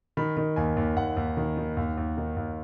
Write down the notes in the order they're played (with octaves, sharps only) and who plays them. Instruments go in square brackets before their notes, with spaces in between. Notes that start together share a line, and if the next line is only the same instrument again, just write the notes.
[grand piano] D#3 B5
D#3
D#2 G#5
D#2
D#2 F#5
D#2
D#3
D#3
D#2
D#2
D#3
D#2